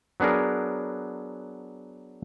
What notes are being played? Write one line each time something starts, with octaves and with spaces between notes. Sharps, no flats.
F#3 B3 D4 G#4 A#4